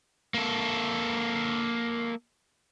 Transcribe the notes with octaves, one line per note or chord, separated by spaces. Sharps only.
A#3 A4